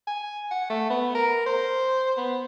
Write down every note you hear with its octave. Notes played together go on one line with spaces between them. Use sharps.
G#5
F#5
A3
B3
A#4
C5
B3